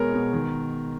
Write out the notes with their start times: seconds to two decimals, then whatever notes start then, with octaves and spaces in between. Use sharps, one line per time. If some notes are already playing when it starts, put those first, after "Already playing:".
Already playing: B2 G#3 B3 A#4 C#5
0.13 B2
0.33 D#3